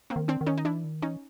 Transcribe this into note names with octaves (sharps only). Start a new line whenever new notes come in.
A#3 C4
D#3
C4 D4
D#3
C#4 D#4
D#4
E3 D4 E4
D#3
E3 C#4 D#4